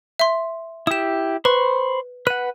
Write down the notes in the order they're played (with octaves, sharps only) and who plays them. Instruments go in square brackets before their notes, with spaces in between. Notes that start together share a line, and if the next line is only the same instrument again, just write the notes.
[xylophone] E5 C6
[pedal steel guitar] E4 G4 [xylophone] D#6 E7
[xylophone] B4 [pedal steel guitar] C5 B5 C#6
[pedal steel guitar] B4 F#5 [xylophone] D#7